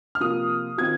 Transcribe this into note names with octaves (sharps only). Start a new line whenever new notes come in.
F6
C3 F3 A#3 F4 D#6
D#3 C4 F4 G#6